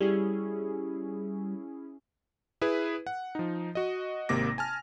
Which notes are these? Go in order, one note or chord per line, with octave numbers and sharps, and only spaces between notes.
G3 C#4 E4 G#4
E4 G#4 B4
F#5
F3 D#4
F#4 D#5
G#1 C3 A#3 D6 A#6
G#5 A5 F6